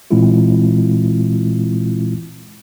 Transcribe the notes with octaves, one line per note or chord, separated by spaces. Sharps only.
A#2 E3 G#3 C4 E4 F4